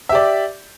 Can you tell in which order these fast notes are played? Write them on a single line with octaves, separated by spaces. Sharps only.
E5 G4 D5